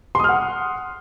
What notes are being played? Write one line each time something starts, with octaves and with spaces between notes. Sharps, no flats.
F#5 C6 D#6 F6